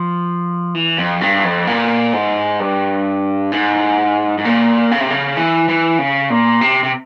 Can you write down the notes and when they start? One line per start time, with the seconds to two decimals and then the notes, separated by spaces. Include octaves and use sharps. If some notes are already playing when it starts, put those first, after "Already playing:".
Already playing: F3
0.75 E3
0.98 F2
1.21 G2
1.44 F2
1.67 A#2
2.13 G#2
2.60 G2
3.52 G#2
4.38 G#2
4.45 A#2
4.91 C#3
5.00 C3
5.10 C#3
5.37 E3
5.69 E3
5.99 C#3
6.30 A#2
6.61 C3
6.84 C3